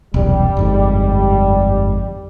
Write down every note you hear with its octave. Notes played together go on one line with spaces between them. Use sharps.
E1 C2 F#2 G3
G1 F2 G#2